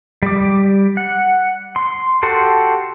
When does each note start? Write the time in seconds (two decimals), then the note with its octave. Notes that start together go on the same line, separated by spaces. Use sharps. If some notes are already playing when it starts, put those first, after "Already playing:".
0.23 G3 D6
0.97 F#5
1.76 C6
2.23 F#4 G4 A4 C6